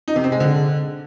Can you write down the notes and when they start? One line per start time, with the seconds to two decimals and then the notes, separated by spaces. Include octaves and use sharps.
0.08 D#4
0.16 C3
0.24 C4
0.32 G#3
0.40 D3